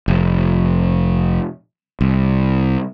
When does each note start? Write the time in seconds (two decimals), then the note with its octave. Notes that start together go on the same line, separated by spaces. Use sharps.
0.08 F1
2.01 C2